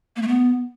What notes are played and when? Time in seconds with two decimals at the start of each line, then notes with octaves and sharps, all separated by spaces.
0.16 A#3
0.22 A3
0.28 B3